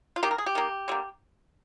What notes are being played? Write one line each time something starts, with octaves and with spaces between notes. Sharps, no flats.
F4
D#3 A#3 G4
A#4
G#4
G4
D#3 A#3
D3 G3 A#3